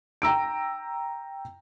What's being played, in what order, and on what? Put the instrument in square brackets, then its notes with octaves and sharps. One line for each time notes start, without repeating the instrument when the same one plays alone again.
[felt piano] G5 A#5 E6 D7